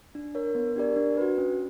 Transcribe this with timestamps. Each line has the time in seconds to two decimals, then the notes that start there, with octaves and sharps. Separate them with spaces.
0.15 D4
0.35 A#4 C#5
0.55 B3
0.76 D4 G4 A#4 D5
0.96 D4
1.17 F#4 B4
1.38 C#4